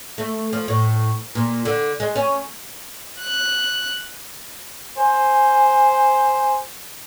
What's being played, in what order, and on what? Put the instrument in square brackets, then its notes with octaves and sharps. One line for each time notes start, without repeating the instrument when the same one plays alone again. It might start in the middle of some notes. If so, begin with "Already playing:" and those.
[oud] A3
F3
A2
A#2
D3
G#3
C#4
[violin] F#6
[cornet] C5 [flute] G#5